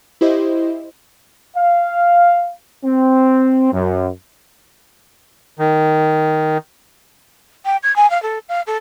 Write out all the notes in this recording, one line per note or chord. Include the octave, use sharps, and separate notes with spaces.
E4 G4 C5 D#5 E5
F5
C4
F#2
D#3
G5
G#6
G#5
F5
A4
F5
A4